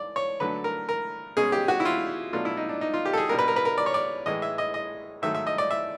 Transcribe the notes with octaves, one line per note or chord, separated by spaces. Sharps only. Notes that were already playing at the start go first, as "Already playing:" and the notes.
Already playing: D5
C#5
D3 F#3 A3 D4 B4
A#4
A#4
B2 G#3 C#4 G#4
G4
F#4
E4
F4
B2 F#3 A3 D4 F4
E4
D#4
D4
D#4
F4
G4
A4
G#4
B2 G3 B3 D4 A#4
B4
A#4
B4
A#4
D5
C#5
D5
A2 E3 G#3 D#5
E5
D#5
D#5
G#2 D#3 F#3 A3 E5
E5
D#5
D5
E5